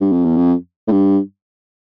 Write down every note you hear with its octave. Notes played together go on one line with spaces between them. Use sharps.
G2
F2
E2
F2
A2
G2